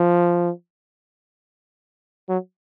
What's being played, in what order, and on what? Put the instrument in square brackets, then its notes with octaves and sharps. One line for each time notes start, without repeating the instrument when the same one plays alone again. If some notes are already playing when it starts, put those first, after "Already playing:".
Already playing: [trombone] F3
F#3